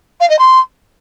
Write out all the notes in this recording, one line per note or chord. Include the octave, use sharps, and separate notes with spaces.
F5
D#5
C6